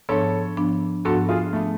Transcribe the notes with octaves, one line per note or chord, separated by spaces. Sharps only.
G#2 F3 B3 D4 A4 C#5
G#2 F3 B3 D4
G#2 F3 B3 D4 F#4 A4
F4 G#4
F3 A3 B3 D4